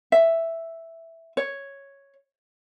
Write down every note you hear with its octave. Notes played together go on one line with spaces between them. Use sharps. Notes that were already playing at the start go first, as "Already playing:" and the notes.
E5
C#5